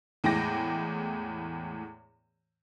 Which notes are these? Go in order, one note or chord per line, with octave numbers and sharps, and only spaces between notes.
E2 A2 G#3 G5 D6 A#6